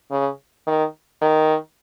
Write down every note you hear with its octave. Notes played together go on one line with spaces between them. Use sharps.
C#3
D#3
D#3